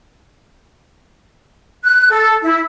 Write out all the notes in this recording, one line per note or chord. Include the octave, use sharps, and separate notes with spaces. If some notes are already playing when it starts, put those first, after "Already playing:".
F#6
A4
E4